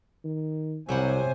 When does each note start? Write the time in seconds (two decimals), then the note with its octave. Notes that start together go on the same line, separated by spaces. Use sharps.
0.24 D#3
0.89 C2 C3 F#3 G3 C5 F#5 G#5